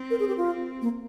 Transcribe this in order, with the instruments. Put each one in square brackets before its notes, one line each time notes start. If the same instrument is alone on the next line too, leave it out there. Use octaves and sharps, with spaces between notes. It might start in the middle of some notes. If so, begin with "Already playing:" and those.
Already playing: [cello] C4
[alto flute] A#4
G#4
G4
F4
[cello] C4
[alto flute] A#3